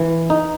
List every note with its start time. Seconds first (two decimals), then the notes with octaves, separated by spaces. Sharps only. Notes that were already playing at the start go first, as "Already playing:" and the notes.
Already playing: E3
0.30 D#4